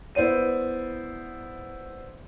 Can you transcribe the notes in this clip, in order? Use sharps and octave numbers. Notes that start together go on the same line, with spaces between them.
B3 E4 C5 D5 D#7